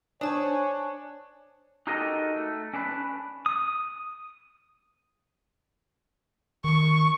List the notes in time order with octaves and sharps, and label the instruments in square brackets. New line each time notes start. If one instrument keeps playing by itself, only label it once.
[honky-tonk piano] D4 [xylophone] C5 A5 D#6 [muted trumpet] C#5 [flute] G#5
[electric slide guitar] D#4 F#4 G4 A4 A#4 D#5
A3
C#4 D4 B4
[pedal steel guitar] D#6
[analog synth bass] D#3 [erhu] C#6